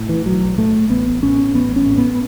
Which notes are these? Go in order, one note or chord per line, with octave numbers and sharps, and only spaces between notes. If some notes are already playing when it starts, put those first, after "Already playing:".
Already playing: A2
E3
B1 F#3
A2 A3
A1 B3
A2 C#4
A1 B3
C#4
A2
B3